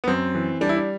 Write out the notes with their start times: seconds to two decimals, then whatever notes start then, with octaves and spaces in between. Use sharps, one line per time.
0.04 B3
0.08 F#2 C4
0.35 E3
0.61 G3 D4
0.69 E4
0.76 D4